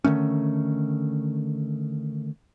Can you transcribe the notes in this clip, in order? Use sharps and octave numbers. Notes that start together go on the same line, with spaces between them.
D3 D#3 A3 C#4